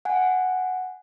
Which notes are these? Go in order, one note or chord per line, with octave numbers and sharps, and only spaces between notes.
F#5 G#5